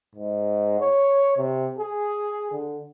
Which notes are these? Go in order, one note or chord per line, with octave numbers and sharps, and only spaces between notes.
G#2
C#5
C3
G#4
D3